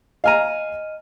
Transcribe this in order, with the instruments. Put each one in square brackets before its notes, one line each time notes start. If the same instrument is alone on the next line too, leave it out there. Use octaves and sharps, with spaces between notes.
[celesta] D#5 F6 D#7 [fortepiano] F5 G#5 A#5